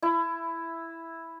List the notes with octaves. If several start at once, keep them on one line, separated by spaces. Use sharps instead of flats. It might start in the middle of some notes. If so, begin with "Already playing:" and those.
E4